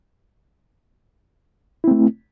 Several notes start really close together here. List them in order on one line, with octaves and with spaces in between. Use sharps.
E4 C4 A3